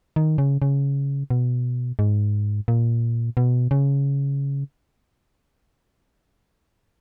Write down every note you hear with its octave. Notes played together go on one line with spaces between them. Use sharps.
D#3
C#3
C#3
B2
G#2
A#2
B2
C#3